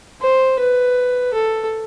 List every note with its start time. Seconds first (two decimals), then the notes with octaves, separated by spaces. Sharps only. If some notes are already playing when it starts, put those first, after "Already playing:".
0.21 C5
0.59 B4
1.34 A4